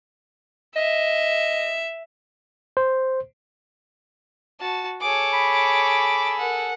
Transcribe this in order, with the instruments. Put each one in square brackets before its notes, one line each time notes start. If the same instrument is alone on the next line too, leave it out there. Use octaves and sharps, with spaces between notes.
[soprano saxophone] D#5 [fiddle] E5
[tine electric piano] C5
[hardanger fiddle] F#4 [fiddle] A5
[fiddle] G#4 A4 [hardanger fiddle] C#5 D6
[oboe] B5
[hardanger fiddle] A#4 F#5